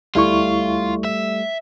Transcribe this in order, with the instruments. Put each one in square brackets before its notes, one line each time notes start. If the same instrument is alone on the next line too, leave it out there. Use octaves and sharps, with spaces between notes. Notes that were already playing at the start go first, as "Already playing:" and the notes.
[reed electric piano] D2 E4 C#6 [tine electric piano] G3 A3 [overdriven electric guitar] F4
[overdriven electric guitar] E5